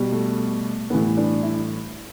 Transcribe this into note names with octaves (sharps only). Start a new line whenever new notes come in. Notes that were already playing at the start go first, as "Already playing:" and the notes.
Already playing: B2 G3
A3
A2 E3 G3 B3
D4
E4